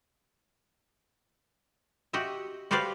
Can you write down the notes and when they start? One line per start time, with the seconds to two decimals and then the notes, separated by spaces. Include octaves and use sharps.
2.13 F#4 G4 D#5 E5
2.71 F#4 G4 B4 C5 D5 F5